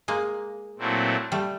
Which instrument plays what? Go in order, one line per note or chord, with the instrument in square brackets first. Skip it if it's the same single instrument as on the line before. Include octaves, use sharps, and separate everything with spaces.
[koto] G#3 A#3
[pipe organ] A#2 F#3 A3 C4 E4
[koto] G3 A3